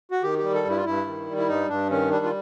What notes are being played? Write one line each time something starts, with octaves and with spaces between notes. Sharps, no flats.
F#4
D#3 G4
G4
G3
A4
G2
E4
F4
G2 E4
D#3
G3
E4
G2 D#4
G2 D4
D#3 C#4
G3 D4
F4